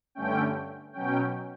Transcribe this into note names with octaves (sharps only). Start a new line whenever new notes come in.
G2 D3 A3 C#4 G5
B2 F#3 C#4 G5